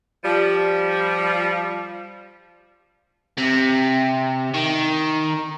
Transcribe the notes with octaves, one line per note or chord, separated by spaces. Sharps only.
F3 G3
C3
D#3